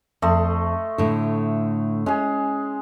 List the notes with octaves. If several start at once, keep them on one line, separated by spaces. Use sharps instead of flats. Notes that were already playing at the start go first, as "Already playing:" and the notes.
F2 A3 D#5 C6
A2 D3
G#3 C#4 G#4